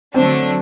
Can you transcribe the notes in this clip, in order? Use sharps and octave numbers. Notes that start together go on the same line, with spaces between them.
D3 F#3 A3 C4 D4 C5